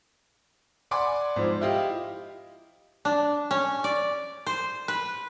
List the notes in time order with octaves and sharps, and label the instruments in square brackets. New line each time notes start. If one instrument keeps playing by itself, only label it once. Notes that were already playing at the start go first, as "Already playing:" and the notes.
[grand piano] D5 F#5 G#5 B5 C6 D6
G#2 F3
E4 F4 G4 D#5 F5
[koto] D4
C#4
D5
C5
B4